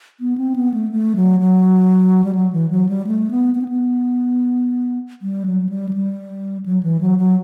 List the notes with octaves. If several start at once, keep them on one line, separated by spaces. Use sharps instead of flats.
B3
C4
B3
A3
A3
F#3
F#3
G3
F#3
E3
F#3
G3
A3
B3
B3
C4
B3
G3
F#3
G3
F#3
G3
F#3
E3
F#3
F#3